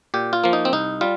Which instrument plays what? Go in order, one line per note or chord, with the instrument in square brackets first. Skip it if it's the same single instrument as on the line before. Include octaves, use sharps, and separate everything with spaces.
[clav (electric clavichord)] A#2 G4
F4
F3 A#3
D#4
C4
C2 D#4
G3 F4